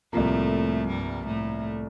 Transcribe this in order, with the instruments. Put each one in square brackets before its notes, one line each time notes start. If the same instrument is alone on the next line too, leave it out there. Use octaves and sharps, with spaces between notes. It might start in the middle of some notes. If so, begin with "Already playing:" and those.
[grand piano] C2 C3 F3 A#3 [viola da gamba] A2 A3
[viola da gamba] G2 G3
A2 A3